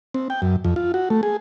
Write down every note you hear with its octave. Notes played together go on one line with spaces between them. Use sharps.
C4
G5
F#2
F2
F4
F#4
A3
G#4